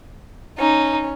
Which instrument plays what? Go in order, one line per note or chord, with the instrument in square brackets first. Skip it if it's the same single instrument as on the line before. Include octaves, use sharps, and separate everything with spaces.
[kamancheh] C#4 [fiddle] D#4